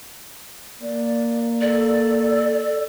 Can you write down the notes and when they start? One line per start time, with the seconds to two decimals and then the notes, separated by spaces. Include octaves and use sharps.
0.82 A#3 D5
1.61 A4 D5